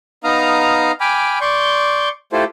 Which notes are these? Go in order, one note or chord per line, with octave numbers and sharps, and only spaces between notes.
B3 D#4 F5 A#5 D#6 F6
G5 G#5 B5 D6 F6
D5 C6 C#6 G6
A3 E4 F4 G4 A4 C5